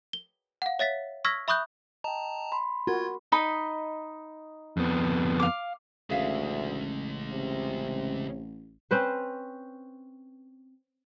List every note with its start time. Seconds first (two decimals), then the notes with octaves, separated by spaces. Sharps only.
0.13 G7
0.62 F5 F#5
0.79 C#5 E5 A6 B6
1.25 C#6 E6 F6 G#6 A#6 B6
1.48 E5 B5 C#6 D#6 F#6 G6
2.04 D#5 G5 A5 A#5
2.52 B5 C6
2.87 F4 F#4 A#4 G#6
3.32 D#4 D#5 B5
4.77 F2 B3
5.40 F5 D6
6.10 A1 D2 C#3 G#3 G#4 E5 F5
7.30 C3
8.91 C4 C#4 B4 C5